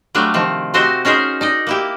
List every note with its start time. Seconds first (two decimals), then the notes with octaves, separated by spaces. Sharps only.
0.15 F#3 G3 A3 D4 F4
0.34 C3 D#3 F3
0.74 A3 C4 F#4 G4 C5 D#5
1.05 C#4 D#4 G#4 A#4 C5
1.41 D#4 D5 D#5
1.67 A#3 E4 G4